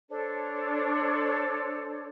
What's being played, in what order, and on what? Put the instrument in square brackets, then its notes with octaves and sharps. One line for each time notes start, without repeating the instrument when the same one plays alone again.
[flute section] D4 A4 C5 C#5